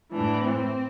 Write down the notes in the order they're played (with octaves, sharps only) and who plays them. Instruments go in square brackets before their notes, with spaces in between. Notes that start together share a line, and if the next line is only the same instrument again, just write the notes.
[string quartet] A2 E3 D4
C4